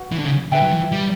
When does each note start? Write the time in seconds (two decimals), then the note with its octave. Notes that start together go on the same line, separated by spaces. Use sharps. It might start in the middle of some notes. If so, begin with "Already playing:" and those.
Already playing: F#4 B4 F#5
0.12 E3
0.19 D3
0.25 C#3
0.52 D3 B4 E5 G5
0.62 F#3
0.72 E3
0.92 G3